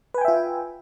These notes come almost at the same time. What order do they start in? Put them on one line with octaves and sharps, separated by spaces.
B4 G#5 G5 E5 F4